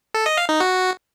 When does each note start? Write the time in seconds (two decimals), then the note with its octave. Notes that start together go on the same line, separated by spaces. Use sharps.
0.14 A4
0.26 D#5
0.37 F5
0.49 D#4
0.60 F#4